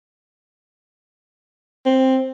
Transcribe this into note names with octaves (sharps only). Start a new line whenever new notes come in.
C4